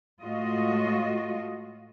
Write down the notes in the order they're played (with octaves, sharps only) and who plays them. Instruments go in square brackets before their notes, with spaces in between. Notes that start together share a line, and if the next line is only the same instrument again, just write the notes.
[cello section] A2 G#3 A3 F4 F#4 D#5